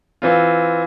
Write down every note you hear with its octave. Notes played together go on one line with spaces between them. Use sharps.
E3 C4 F4